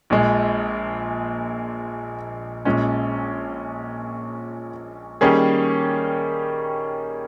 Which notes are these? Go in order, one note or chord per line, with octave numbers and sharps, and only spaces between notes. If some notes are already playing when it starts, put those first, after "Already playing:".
A#1 A#2 G#3
A#1 A#2 G#3 C#4
D#3 G3 A#3 C#4 G#4